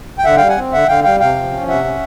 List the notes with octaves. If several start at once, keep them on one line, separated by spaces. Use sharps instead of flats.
G5
D3 E5 F#5
G3 F5 G5
F#5 G#5
C4
D3 E5 F#5
D3 F5 G5
G3 F5 G5
C3 F5 G5
F3
C#4
C3 E5 F#5
C#4